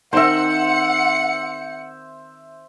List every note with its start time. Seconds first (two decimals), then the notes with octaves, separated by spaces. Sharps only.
0.13 D#3 C4 A#4 C5 E5 F#5 C#7